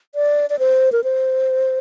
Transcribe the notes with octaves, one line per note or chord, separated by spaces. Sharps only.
D5
D5
C5
A#4
C5